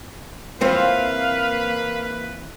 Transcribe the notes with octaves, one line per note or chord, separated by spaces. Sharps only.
E3 A#3 C4 F4 B4 F5